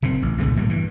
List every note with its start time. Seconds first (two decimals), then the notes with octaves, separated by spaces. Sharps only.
0.02 F#1 A#2 D#3 C4
0.22 A1
0.39 C2 A#2 D3 G#3
0.56 A2 G3 A#3
0.69 G2 E3